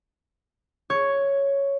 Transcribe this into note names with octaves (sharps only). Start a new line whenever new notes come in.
C#5